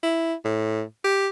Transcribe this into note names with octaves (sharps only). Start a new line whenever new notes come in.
E4
A2
G4